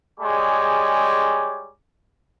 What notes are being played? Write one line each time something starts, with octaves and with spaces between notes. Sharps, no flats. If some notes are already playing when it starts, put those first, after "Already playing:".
G3 G#3 G#4 C#5 D6